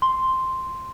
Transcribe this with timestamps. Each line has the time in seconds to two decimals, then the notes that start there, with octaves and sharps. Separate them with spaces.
0.02 C6